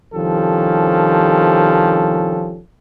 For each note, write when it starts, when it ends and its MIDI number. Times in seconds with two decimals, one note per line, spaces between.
0.15 2.59 36
0.15 2.59 51
0.15 2.59 53
0.15 2.59 61
0.15 2.59 67
0.15 2.59 69